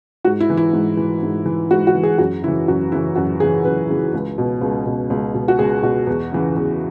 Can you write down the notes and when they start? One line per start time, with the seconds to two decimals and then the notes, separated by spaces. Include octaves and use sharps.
0.25 G#2 F#4
0.40 E4
0.50 E3
0.57 E4
0.73 G#2
0.97 E3
1.23 G#2
1.46 E3
1.71 G#2 F#4
1.87 F#4
1.95 E3
2.03 G#4
2.18 F#2 F#4
2.43 C#3 E4
2.48 E3
2.68 F#2 F#4
2.92 C#3 E3 E4
3.16 F#2 F#4
3.40 C#3 E3 G#4
3.65 F#2 B4
3.89 C#3 E3
4.14 C#2
4.38 B2
4.61 C#2
4.86 B2
5.10 C#2
5.34 B2
5.48 F#4
5.59 C#2 G#4
5.82 B2 F#4
6.07 E2
6.32 C#3 E3
6.56 E2